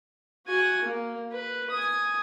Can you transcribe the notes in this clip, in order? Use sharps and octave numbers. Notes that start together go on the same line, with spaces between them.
F#4 G#5
A#3
B4
G#5 D#6